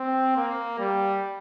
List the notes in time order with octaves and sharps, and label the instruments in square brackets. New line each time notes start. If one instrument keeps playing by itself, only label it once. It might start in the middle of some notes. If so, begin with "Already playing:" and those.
Already playing: [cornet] C4
A#3
G3